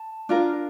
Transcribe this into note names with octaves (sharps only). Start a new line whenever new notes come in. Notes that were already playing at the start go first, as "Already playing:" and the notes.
Already playing: A5
D4 F4 A#4